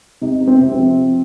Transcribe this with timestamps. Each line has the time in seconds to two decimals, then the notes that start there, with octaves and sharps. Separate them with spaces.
0.22 C3 D#4
0.41 C3
0.48 C4
0.60 C3
0.72 C4
0.78 F3
0.98 C3